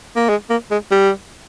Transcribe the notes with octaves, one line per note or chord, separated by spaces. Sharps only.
A#3
G#3
A#3
G#3
G3